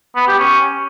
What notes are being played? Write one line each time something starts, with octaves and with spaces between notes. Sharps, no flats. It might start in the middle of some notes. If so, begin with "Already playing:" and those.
B3
G4
C#4